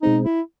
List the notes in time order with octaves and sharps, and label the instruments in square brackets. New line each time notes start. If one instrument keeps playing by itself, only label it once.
[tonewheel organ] B2 G#3 C4 [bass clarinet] D#4
[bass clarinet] E4